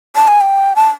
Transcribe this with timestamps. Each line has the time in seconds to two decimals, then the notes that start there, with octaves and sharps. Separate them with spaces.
0.15 A5
0.28 G#5
0.41 G5
0.76 A5